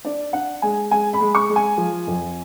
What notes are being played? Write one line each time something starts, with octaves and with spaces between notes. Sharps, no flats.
D4 D5
D4 F#5
G#3 G#5
G#3 G#5
B5
G#3
C#6
G#3
G#5
F3
F2